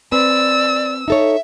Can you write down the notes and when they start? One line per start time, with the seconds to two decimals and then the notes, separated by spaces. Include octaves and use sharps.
0.12 C4 B4 D5 E6
1.08 D#4 A4 C#5 E5